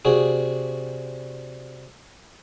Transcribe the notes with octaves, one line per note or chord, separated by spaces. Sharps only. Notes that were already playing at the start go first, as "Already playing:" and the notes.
C3 D4 F#4 G#4